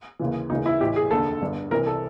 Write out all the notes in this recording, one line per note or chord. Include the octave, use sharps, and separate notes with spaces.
D#2 C#3 E3
E1 D2 C#3 E3 D#4
E4
A1 A2 E3 G4
G#4
F1 D#2 D3 A4
G1 G2 D3
C2 C3 E3 A#4
A4